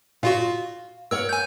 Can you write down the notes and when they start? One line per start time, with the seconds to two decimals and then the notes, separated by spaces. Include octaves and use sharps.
0.23 A#2 F4 F#4 F5
1.11 A#4 C#5 F#5 E6
1.29 G#5 G6